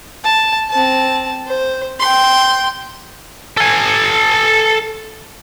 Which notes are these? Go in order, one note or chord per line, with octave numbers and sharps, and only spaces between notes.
A5
C4 A5
C5
G5 C6
A4 G#5